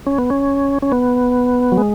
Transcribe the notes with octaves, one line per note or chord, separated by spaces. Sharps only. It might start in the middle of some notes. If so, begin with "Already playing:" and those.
C#4
B3
C#4
C#4
B3
F#3
G#3